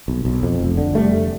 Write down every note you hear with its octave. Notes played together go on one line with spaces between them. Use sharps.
B1
B1
F2
F1
D3
F1 G3 A3
F1